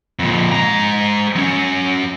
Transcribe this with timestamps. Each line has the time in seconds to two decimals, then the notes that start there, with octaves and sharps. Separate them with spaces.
0.19 F2 A#2
0.52 G#3 A#5
1.36 F#3 C#4